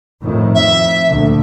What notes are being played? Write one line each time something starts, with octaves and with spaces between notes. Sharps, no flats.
F2 A2 D#3
F2 E5
D2 A#2 D3